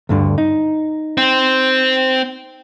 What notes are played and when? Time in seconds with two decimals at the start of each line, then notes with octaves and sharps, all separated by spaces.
0.09 D2 G2 D3
0.38 D#4
1.17 C4